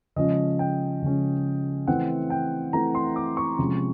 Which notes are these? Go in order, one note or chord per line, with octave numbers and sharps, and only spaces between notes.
C#3 F3 G#3 C#4 D#5
G5
C#3 F3 G#3 C#4
E3 A3 C4 F#5
G5
E3 A3 C4 A#5
C6
D6
C#6
C3 F3 G#3 C#4